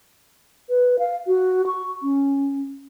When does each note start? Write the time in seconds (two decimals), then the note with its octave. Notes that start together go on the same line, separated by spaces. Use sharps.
0.69 B4
0.99 F5
1.27 F#4
1.67 C#6
2.03 C#4